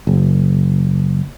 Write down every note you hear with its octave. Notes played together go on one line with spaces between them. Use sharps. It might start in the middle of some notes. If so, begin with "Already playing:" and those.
F#1